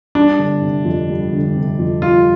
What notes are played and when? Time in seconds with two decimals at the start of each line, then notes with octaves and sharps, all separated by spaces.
0.15 G3 D4
0.39 G1
0.62 C3
0.85 F2
1.10 G3
1.32 G1
1.56 C3
1.79 F2
2.02 G3 F4